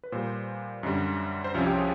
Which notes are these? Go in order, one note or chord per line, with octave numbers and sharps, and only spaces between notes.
B4
A#2 G3 C5
F#2 D3 G3
C5
C2 C3 F3 C#4 C#5
G4 G5
G#4 G#5